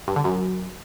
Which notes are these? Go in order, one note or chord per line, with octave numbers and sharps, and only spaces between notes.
G2
D3
F#2